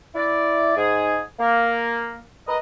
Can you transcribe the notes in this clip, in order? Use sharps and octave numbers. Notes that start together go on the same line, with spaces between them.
E4 D5
G#2 G#4
A#3
G#3 A#4 B4 D#5